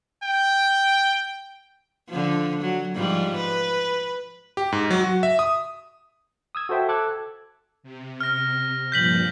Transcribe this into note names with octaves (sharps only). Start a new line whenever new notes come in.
G5
D3 F3
F#3
G#2 F3 G3
B4
G4
G#2
F#3
F#4
E5
D#6
D#6 E6 G#6
F#4 A4 C5 E5 G5
A4 D6 F#6 G#6
C3
F6 A#6
G2 A#2 F3 G6 B6 F#7